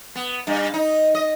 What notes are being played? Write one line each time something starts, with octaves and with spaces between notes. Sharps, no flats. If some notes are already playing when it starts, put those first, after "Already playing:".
B3
G2
D#4
D#5